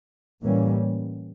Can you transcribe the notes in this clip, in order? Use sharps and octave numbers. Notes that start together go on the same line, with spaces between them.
A2 E3 G3 A#3 C#4